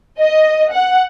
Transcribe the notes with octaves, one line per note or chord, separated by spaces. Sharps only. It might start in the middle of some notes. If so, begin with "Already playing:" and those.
D#5
F#5